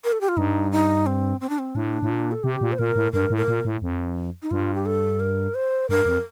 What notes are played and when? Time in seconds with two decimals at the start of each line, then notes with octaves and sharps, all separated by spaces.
0.04 A#4
0.12 A4
0.21 G4
0.29 F4
0.37 G2 D#4
0.72 D#4
1.06 C4
1.41 C4
1.49 D4
1.59 C4
1.75 A2 D4
2.02 A2
2.10 A#2
2.32 A4
2.44 C3 G4
2.61 A#2
2.72 C5
2.79 A#2 A#4
2.96 A2
3.13 G2 A#4
3.30 A2
3.37 A#4
3.48 A#2
3.65 A2
3.82 F2
4.42 D#4
4.51 G2 F4
4.75 G4
4.86 A4
5.20 A#4
5.55 C5
5.89 G2 A#4
6.06 F2